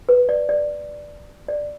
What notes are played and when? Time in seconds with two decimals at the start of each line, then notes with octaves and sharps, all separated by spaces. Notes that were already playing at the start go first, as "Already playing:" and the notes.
0.09 B4
0.29 D5
0.49 D5
1.48 D5